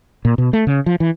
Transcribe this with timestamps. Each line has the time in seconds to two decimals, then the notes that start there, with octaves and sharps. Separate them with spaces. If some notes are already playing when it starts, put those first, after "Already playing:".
0.25 A#2
0.38 B2
0.53 A3
0.67 C#3
0.86 F3
1.00 E3